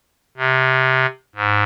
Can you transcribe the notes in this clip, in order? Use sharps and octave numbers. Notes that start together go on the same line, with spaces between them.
C3
G#2